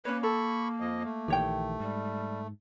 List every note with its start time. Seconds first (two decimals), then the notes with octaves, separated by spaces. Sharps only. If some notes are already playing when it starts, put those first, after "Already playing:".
0.05 A#3 C#4 B4 C#5
0.23 A4 B5 C#6
0.80 F2 F3 D#5
1.04 A3
1.28 A#1 D#3 E3 G4 C#5 G5
1.80 G#2 G3